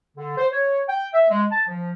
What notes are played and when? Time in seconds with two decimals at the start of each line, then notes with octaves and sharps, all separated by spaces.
0.18 D3
0.38 C5
0.53 C#5
0.89 G5
1.14 E5
1.30 G#3
1.51 A5
1.67 F3